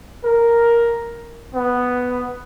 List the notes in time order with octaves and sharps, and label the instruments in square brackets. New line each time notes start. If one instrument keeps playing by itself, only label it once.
[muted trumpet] A#4
B3